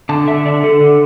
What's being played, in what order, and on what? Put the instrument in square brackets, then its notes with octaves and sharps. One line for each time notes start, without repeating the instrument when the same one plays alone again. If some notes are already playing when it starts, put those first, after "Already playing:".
[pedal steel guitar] D3 A5
D3 E5
D3 D5
D3 A4
D3